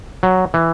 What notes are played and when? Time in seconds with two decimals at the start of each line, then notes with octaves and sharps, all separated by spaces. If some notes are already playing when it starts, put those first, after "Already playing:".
0.23 F#3
0.54 E3